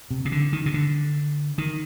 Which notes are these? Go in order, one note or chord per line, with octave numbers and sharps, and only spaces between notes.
C3
C3
D3
D#3
C3
D3
D#3